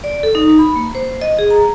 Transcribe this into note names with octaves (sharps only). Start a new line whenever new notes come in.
D5
A4
D#4
B5
A#3
C5
D#5
G#4
A#5